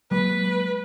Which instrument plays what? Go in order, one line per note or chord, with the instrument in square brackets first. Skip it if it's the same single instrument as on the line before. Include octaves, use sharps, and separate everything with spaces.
[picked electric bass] F#3 G#3 A#3 [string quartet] B4